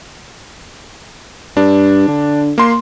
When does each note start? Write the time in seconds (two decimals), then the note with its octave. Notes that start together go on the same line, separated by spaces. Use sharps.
1.57 G2 D4
2.08 D3
2.58 A#3 C6